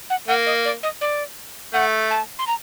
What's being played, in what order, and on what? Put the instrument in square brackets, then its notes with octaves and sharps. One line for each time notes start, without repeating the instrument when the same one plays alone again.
[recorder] F#5
[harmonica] A#3 [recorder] F#5
[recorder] D#5
D5
D#5
D5
[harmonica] A3 [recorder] F#5
[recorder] A5
C6
A#5